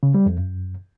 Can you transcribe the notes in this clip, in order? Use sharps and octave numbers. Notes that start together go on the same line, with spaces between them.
C#3
G3
F2
F#2